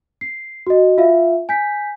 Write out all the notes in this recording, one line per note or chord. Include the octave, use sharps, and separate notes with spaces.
C7
F#4 D#5
F4 E5 F5
G#5 G6 B6